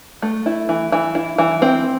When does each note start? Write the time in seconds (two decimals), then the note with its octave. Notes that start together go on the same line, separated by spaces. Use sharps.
0.22 A3
0.46 E4
0.69 E3
0.92 E3
1.15 E4
1.38 E3
1.62 C4